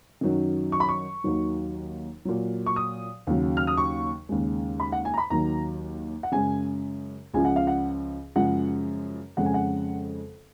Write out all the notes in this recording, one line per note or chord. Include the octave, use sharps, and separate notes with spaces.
F#2 D#3 F#3
C#6
B5
C#6
D#2 D#3 F#3
A#2 F#3
C#6
D#6
D#2 C#3 F#3
F6
D#6
C#6
D#2 C#3 G#3
B5
F#5
G#5
A#5
B5
D#2 D#3 F#3 A#5
F#5
F#2 C#3 G#3 G#5
C#2 C#3 F3 G#5
F#5
F5
F#5
F#2 C#3 F3 G#3 F#5
F2 C#3 G#3 F#5
G#5
F#5